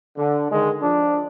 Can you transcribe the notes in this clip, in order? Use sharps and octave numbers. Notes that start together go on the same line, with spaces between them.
D3
D3 D#3 G#3
F3 D4